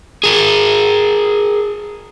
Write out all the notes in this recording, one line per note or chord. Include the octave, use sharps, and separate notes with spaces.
G#4 A#4